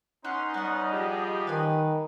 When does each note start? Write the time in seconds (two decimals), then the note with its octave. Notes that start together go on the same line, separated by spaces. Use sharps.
0.24 B3 C#4 D#4 C6 F#6
0.54 G3 B3 D#5 F#5
0.93 F3 G4 G#4
1.47 D#3 B4 G#5